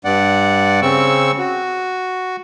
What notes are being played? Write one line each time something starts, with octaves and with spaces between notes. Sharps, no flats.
G2 D5 F#5
C#3 C4 C#6 E6
F#4